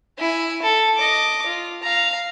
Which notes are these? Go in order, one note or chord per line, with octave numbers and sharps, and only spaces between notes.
E4 G#5
A4
D#5 D6
F4
F5 A#5